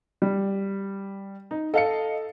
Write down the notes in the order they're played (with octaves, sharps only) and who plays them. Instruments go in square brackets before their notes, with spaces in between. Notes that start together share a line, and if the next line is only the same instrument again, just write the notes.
[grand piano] G3
[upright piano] D#4
[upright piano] A4 C#7 [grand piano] D#5 F5